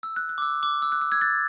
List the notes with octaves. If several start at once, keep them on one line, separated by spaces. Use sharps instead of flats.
E6
F#6
F#6
D6
E6
D6
E6
F#6
E6
E6 G#6
F#6 A6